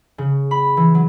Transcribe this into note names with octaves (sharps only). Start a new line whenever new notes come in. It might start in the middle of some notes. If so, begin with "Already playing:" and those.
C#3
B5
E3
F#3